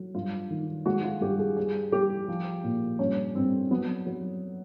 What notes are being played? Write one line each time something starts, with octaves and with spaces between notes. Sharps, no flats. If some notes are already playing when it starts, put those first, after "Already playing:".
Already playing: F#3
G2 F4
D#3
G#3 F#4
F4
G2 G4
G#4
G3 G#4
G3 G4
F3
A#2
G2 C#4
G2 C4
F#3 B3
F#3